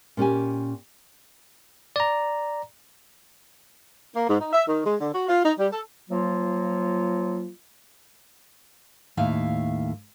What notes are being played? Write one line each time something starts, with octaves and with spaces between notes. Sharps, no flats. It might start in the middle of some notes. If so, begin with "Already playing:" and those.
A#2 C#4 G4 G#5
D5 A#5
A#3
G#2
D#4
E5
D#3
G#3
D3
F#4
F4
D#4
G3
A4
F3 F#3 A#3 F4
D#2 A2 E5 F5